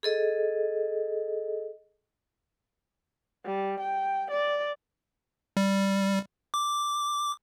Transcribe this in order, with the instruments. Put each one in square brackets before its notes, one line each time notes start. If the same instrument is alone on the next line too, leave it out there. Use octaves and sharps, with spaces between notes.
[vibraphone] G#4 A4 D#5
[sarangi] G3
G5
D5
[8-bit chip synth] G3
D6